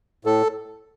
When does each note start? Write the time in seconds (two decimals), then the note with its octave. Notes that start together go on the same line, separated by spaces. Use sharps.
0.25 A2 A4